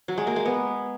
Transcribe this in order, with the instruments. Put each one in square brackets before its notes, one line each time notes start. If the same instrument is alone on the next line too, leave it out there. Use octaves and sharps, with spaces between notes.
[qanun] F#3
G#3
A#3
G#3
B3